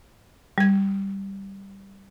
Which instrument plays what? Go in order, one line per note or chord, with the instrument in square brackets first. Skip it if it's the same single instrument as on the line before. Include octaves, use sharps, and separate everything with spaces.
[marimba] G3 G#6